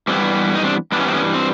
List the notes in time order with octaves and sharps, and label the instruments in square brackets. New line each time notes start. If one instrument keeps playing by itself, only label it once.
[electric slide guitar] G2 E3 G3 B3 C4
D#4
C4 D4
G2 E3 G3 B3 D4
C#4
C4
B3 C#4
C4